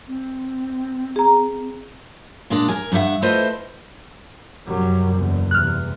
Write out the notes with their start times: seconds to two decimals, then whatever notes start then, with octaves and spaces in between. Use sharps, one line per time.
0.08 C4
1.16 G#4 A#5
2.50 A#2 G#3 D4
2.68 A#4 G#5
2.92 G2 D#4 A4 E5 F#5
3.22 A3 E4 F4 B4 C5 D#5
4.66 F1 F#2 F#3 G3
5.17 F#1 E2
5.51 E2 C3 E3 G3 F6 F#6